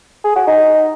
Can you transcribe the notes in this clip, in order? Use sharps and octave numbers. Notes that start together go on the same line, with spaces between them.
G#4
F#4
D#4